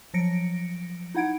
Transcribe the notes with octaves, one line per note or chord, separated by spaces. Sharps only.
F3 F#3 A#6 C#7 D7
D#4 E4 F#5 G#6 D7